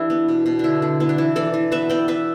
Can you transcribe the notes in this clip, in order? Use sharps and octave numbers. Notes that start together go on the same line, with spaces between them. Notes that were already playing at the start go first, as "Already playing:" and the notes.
Already playing: E3 A3 D4 E4 G4
B3
B2
B2
D3 D4 E4
D3
B3 E4
D4
E3 E4
E3 A4 D5
E3
B3 B4 E5
B3 D5 G5
B3 B4 E5